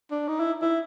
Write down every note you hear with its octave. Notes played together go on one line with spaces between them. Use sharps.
D4
D#4
E4
E4